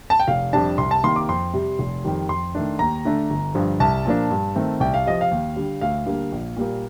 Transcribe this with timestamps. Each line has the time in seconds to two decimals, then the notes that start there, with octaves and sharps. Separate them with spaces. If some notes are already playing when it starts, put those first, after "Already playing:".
0.10 A5
0.20 G5
0.28 F1 F5
0.53 F2 C3 G3 D4 A5
0.78 C2 C6
0.91 A5
1.04 C3 D#3 A#3 C6
1.16 D6
1.29 F2 C6
1.54 C3 G3
1.79 F1
2.04 F2 D#3 G3
2.29 F2 C6
2.55 D#3 A3 D4
2.79 D#2 A#5
3.05 D3 A3 D4
3.30 G1
3.55 G2 D3 F3
3.80 C2 A5
4.06 A#2 F3 A#3 D4
4.30 G2
4.56 D#3 A3 C4
4.80 C2 G5
4.94 F5
5.06 C3 F3 D#5
5.21 F5
5.31 D#2
5.56 D3 G3
5.81 D2 F5
6.06 D3 G3 A#3
6.32 A#1
6.57 A#2 G3 A#3